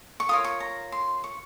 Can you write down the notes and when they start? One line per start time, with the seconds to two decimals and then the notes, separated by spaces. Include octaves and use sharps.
0.20 C#6
0.29 F4 A#4 C#5 D#6
0.44 C#6
0.60 A#5
0.92 C6
1.24 C#6